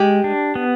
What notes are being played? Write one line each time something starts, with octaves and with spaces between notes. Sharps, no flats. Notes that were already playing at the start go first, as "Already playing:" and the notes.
Already playing: G#3 G4
D4
B3